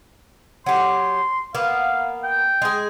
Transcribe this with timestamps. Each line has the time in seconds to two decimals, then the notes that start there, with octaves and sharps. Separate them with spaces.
0.66 F#3 G4 C6
1.55 A#3 B3 F5
2.24 G5
2.62 G#3 G#4